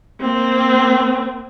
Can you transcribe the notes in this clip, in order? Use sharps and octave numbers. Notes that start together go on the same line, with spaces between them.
A#3 C4